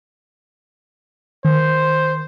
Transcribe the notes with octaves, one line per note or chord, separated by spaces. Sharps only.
D#3 C5